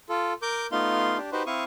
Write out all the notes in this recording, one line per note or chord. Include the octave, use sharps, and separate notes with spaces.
F4 A4
A#4 D6 G6
A3 B3 D#4 F4 F5 C6
D4 G4
D#4 F#4 G4 B4 C5
C4 E4 F5 C#6 D#6